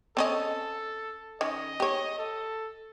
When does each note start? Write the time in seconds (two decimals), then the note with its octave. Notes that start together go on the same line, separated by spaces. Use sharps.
0.17 C4 C#4 A4 D#5
1.41 D#3 C#4 D#5
1.80 G4 C#5
2.18 A4